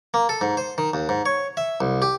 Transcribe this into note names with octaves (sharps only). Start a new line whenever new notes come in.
A#3
A4
G#2
C5
D#3
D#2
G#2
C#5
E5
C2
G4